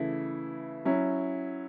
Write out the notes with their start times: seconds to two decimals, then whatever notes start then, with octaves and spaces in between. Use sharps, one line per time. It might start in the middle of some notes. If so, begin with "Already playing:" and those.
Already playing: C#3 E3 A3 E4
0.85 F#3 C#4 E4